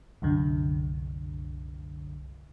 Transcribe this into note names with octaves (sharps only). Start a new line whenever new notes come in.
C2 F#2 D3